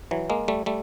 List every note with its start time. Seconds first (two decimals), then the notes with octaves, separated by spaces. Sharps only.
0.11 E3 F#3
0.30 G#3 A#3
0.48 G3 A3
0.66 G3 A3